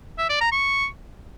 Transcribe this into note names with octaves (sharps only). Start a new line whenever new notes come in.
E5
D5
A#5
C#6